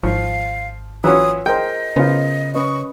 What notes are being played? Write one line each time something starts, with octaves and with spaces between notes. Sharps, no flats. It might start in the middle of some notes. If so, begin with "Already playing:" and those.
G#1 F3 F5 C#6
E3 F#3 C#4 F4 C#5 F#5 D#6
G#4 A#4 C5 D#5 G5
C#3 B3 C#4 F4 A#4 C5
C#4 B4 D#5 C#6